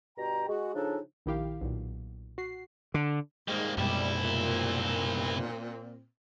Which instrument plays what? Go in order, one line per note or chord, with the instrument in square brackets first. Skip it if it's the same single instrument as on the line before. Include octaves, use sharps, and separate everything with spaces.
[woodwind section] G2 B2 G5 A#5
G#3 F#4
C#3 F3 D4 D#4 A4
[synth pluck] A#1 D#3 E4 G4 F5
B1 A#2
F#4 C7
[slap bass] D3
[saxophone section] G#2 [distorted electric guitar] G3 A#3
[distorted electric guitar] C2 E4 [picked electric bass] F#2 B2 G#3 [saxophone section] G3
[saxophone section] A#2 C4